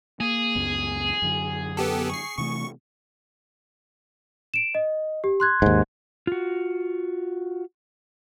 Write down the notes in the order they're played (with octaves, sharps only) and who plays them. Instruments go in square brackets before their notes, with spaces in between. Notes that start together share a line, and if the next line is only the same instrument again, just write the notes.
[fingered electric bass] A#3 [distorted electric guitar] G#4
[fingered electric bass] C#2 F#2 B3
F#2 D3 F#3
[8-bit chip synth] B3 G4 A4
C#6 C7
[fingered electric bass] C3 E3 A3 [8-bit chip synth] C#6
[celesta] D7 E7
D#5
G4
C6 F#6 G#6
[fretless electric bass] D#2 G#2
[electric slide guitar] F4 F#4